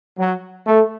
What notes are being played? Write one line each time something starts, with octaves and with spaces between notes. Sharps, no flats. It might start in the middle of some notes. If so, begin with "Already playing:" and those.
F#3
A3